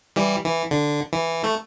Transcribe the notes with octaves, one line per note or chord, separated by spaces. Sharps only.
E3 G3
E3
D3
E3
A3